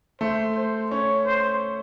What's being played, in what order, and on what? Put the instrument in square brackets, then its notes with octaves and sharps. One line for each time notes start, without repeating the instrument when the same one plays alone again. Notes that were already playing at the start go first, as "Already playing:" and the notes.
[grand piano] A3 [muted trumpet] C5
[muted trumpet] C5
[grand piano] C#4 [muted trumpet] C#5
[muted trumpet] C5